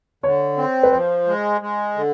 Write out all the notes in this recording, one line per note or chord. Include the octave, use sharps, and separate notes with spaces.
D3 C#5
C4
B4
F3 C5
G#3
G#3
D3